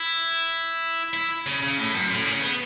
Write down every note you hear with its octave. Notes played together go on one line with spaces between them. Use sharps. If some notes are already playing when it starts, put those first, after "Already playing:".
Already playing: E4
E4
C#3
C#3
A2
F#2
A2
C#3
B3